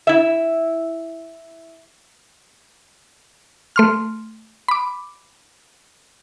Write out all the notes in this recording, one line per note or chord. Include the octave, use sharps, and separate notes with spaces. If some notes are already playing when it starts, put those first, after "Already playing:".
E4 E5
A3 C6 F6
B5 D6